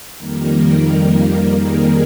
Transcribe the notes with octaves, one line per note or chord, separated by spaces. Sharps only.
F2 D#3 G3 A#3 A#4
G#4